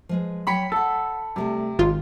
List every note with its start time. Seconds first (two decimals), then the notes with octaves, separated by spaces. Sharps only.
0.09 F3 G#3 B4
0.47 F#3 C#5 G5 B5 B6 C#7
0.72 A4 F5 F#5
1.36 C3 G3 A3 G4
1.79 G#1 F4 G4